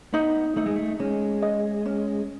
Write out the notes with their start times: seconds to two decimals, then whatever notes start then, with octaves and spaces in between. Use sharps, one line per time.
0.13 B3 D#4
0.56 A3 D#4
0.66 G#3
0.76 A3
1.00 G#3 C#4
1.42 D#5
1.86 C#4